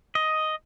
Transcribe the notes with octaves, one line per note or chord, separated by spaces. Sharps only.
D#5